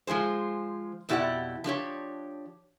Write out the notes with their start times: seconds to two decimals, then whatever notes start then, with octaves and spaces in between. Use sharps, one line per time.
0.07 F3 G#3 G#4 C5
1.09 F2 B2 E4 G4 D5 F#5
1.64 F3 D4 G4 C#5